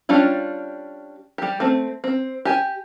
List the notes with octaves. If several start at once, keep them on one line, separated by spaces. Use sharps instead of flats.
G3 C#4 D4 F4
G3 G4
A3 C4
C4
G4 G#5